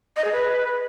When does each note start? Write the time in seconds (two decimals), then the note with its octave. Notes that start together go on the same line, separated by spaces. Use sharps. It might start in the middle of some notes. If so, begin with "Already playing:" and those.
0.16 D#5
0.24 G#4
0.32 B4